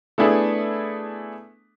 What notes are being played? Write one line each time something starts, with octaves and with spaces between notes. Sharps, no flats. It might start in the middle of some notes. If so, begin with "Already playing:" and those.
A3 B3 D4 E4 G#4 A4